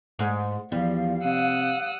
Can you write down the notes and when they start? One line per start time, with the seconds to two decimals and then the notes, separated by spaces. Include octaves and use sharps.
0.19 G#2
0.72 E2 F3 G3 F5
1.25 C3 F#5 D#6 E6